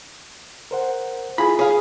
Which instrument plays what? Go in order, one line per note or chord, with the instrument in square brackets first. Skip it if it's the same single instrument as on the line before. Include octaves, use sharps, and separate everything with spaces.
[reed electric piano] A#4 C5 F#5
[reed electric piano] E4 F4 G#4 [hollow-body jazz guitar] B5
[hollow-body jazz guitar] G#4 F5 [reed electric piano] C#5